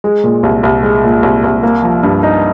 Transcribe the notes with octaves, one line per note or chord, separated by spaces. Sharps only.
G#3
A#2
C2
C2
G#3
A#2
C2
C2
A#3
F3
G2
D#4